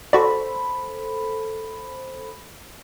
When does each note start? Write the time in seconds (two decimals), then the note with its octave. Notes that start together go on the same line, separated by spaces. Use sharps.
0.13 F#4 A4 C5 D5 B5